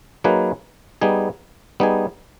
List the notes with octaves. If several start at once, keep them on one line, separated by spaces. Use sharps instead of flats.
F#3 A#3 D#4 G#4 B4
G3 B3 D#4 G#4
G3 B3 D#4 G#4